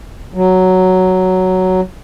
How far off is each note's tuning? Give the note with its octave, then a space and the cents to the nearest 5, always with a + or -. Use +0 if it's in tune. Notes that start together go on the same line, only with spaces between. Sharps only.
F#3 +5